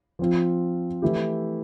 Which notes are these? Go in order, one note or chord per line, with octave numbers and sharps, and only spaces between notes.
F3 C4 F4
E3 A3 E4 G4